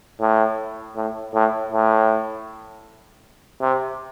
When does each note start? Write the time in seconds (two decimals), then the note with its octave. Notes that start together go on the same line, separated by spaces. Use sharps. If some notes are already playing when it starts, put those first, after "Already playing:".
0.20 A2
0.96 A2
1.34 A2
1.72 A2
3.61 C3